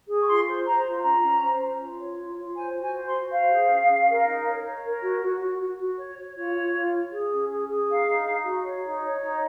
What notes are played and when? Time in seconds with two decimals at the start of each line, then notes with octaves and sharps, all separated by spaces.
0.08 G#4
0.21 C#6
0.28 F4 C6
0.47 C5
0.65 C5 A#5
0.85 F4
1.03 C#4 A#5
1.23 C#4
1.41 C5
1.60 C#4
1.80 F4
1.99 C#5
2.17 F4
2.36 F4
2.56 C5 G#5
2.75 F#4
2.81 G#5
2.94 C5
3.06 C6
3.13 F#4
3.31 C5 F5
3.51 G#4
3.70 C#4
3.89 C#4
4.08 A#4
4.26 D#4
4.46 C#5
4.64 C#5
4.84 A#4
5.02 F#4
5.22 F#4
5.41 F#4
5.59 F#4
5.78 F#4
5.98 C#5
6.17 C#5
6.35 F4 C#5
6.54 F4
6.73 F4
6.92 C#5
7.11 G#4
7.31 C#4
7.49 G#4
7.69 G#4
7.88 D#4 F5
8.07 D#4
8.26 D#4
8.44 F#4
8.63 C#5
8.83 D#4
9.01 C#5
9.20 D#4